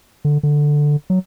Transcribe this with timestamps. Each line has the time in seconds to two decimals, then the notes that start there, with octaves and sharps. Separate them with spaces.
0.25 D3
0.43 D3
1.10 F#3